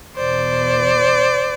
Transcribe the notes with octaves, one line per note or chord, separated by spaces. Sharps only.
E2 B2 C5 D5